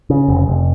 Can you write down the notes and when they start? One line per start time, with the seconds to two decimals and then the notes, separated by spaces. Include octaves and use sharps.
0.10 C#3
0.28 F1
0.47 F1